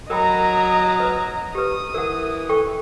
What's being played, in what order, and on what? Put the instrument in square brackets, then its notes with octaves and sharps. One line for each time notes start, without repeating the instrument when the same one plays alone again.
[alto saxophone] F#3 [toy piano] A#4 G5 B5 [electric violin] D#5 A#5
[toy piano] B4
[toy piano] G4 B4 [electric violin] D#6
[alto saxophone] E3 [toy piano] A#4 F#5
[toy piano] A4 G5 C#6